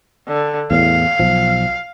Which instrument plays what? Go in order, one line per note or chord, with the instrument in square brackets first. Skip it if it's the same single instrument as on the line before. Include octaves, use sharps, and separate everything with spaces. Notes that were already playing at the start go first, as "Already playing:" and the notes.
[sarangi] D3
[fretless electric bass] E2 A2 [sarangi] F5
[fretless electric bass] B1 F3